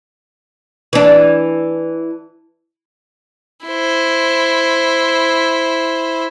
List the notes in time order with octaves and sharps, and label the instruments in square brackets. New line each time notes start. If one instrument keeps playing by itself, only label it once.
[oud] E3 D4
[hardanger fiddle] E4 C5